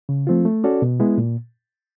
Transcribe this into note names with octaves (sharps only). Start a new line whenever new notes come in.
C#3
F3 A3 C4 F4
A3
C#4 F#4 A4 D5
B2
G#3 B3 E4
A#2